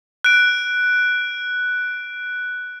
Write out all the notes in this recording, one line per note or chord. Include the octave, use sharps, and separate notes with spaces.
F#6 D7